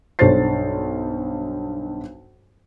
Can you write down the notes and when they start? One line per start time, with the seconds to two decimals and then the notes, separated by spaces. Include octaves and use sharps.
0.19 B1 G2 C5 C#5 A6 C7